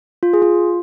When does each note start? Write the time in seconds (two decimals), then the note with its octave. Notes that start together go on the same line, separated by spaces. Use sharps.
0.23 F4
0.33 G#4
0.42 F4